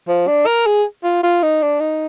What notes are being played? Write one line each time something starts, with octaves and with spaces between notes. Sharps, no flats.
F3
D4
A#4
G#4
F4
F4
D#4
D4
D#4